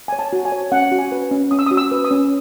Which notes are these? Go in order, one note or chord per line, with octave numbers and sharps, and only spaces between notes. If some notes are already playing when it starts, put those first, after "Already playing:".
C#5 G#5
A5
F#4
G#5
C#5
C#4 F#5
F#4
G#5
B4
C#4
C#4 D#6
E6
F#4 D#6
E6
B4
D#6
C#4